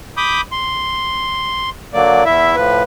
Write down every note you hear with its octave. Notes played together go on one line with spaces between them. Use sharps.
B5 D6 D#6 G6
C6
D3 F#3 A#3 D5
E2 E4 E5
A2 F3 B4